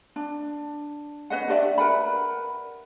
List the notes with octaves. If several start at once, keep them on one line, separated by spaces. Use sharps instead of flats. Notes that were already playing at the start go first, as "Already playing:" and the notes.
D4
C#4 B4 D#5 F#5
D4 G4 D5 E5
A#4 B4 F#5 B5